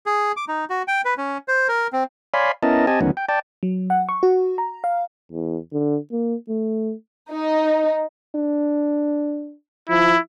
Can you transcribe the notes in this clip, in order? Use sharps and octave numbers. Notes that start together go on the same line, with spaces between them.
G#4
D6
D#4
F#4
G5
B4
C#4
C5
A#4
C4
C#5 D5 F5 G#5 B5 C6
B3 C#4 E4 A#4 D#5 A5
C4 G4 D#5 G#5 A5
D2 D#3 F#3 B3 C#4
G5
D5 G5 A5
F#3
F#5
C#6
F#4
A#5
F5
E2
D3
A#3
A3
D#4
D4
F3 E4